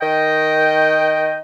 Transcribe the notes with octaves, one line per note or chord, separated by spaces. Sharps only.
D#3 D#5 G5